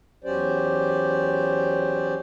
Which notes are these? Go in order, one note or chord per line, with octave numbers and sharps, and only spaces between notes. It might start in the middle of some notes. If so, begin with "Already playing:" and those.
E2 F#3 C#4 G4 C5 D5